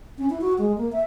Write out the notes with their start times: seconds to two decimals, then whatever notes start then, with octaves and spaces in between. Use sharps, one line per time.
0.18 C#4
0.30 E4
0.41 F#4
0.58 G#3
0.78 A#3
0.92 E5